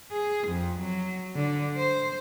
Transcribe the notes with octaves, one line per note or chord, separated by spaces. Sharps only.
G#4
F2
F#3
D3
C5